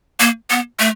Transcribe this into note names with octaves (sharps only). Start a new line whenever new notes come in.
A#3
B3
A3